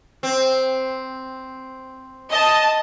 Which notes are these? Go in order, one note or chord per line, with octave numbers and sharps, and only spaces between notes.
C4
D#5 A5